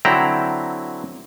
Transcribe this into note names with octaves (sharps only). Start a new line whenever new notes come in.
D3 F#3 C4 E4 G5 A#5